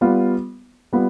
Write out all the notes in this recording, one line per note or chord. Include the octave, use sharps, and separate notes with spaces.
G3 B3 F4
G3 B3 F4